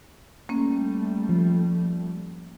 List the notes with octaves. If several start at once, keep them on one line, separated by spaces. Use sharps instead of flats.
G3 A3 A#3 C#4
F3